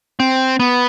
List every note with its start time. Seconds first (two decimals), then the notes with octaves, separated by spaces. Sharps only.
0.20 C4
0.60 B3